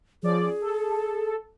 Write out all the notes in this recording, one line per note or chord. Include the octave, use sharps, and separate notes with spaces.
F3 C#4 G#4 D5
A4